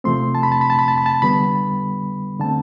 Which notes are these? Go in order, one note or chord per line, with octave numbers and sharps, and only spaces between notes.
C3 F3 A3 C4 C6
A5
B5
A5
B5
A5
B5
A5
B5
A5
D3 G3 B3 B5
D3 A3 C4 A5